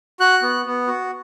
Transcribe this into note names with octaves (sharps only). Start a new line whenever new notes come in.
F#4 F#6
B3
B3
F#4